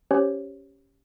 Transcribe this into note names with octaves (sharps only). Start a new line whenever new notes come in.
C#4 G4 C5 C#5